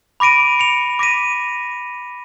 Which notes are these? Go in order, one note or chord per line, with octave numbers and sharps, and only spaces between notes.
B5 D6 A#6 D7 D#7
C#7 D7 F7
D6 A#6 B6 D#7